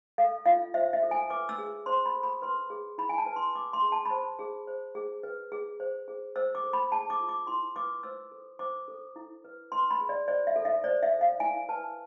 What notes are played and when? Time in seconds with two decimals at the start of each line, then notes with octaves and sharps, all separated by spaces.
0.18 A4 F5
0.46 F4 F5
0.74 C5 E5
0.93 E5
1.03 A4
1.11 G#5
1.30 B4 D6
1.49 E6
1.58 G#4
1.86 C5 C6
2.06 B5
2.15 A4
2.23 B5
2.42 B4 C6
2.70 G#4
2.98 E4 B5
3.09 G#5
3.18 A5
3.26 B4
3.36 C6
3.55 B4 D6
3.73 C6
3.82 G#4
3.92 A5
4.05 B5
4.10 C5 A5
4.39 G#4
4.67 C5
4.95 G#4
5.23 B4
5.52 G#4
5.80 C5
6.08 G#4
6.36 C5 E6
6.55 D6
6.64 A4
6.73 B5
6.91 G#4 A5
7.10 D6
7.20 F4
7.29 D6
7.47 E4 C6
7.76 B4 D6
8.03 C5 E6
8.32 A4
8.59 C5 D6
8.88 A4
9.16 E4
9.45 B4
9.72 B4 C6
9.91 B5
10.00 G#4
10.09 D5
10.28 C5 D5
10.47 E5
10.56 A4
10.65 E5
10.84 C5 D5
11.03 E5
11.12 A4
11.21 F5
11.40 E4 G#5
11.69 B4 A5